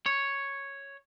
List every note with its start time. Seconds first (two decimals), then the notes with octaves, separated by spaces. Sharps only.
0.06 C#5